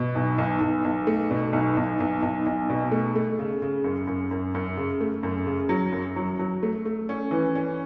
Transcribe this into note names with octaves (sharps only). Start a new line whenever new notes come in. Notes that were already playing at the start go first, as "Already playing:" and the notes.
Already playing: B2
B1
B1
B1
B1
A3
B2
B1
B1
B1
B1
B1
B2
A3
A3
C#3
C#3
F#2
F#2
F#2
F#2
C#3
A3
F#2
C#3
F#3
F#2
F#3
F#3
A3
A3
C#4
E3
C#4